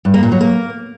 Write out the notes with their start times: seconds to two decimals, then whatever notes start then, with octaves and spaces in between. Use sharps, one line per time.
0.05 G2
0.14 A#3
0.23 A#2
0.32 F#3
0.41 A#3